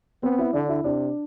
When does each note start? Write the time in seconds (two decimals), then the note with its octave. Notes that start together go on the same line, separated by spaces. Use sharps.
0.23 B3 C4 C5
0.38 E4 E5
0.53 D3 D4 D5
0.69 E4 E5
0.84 C3 D4 D5